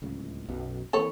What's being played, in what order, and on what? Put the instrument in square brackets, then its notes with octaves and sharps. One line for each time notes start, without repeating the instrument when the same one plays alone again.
[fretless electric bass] D1 C#2 C#3
B1 F#2 B2
[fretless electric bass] E3 A#3 C4 [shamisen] A4 B4 C#5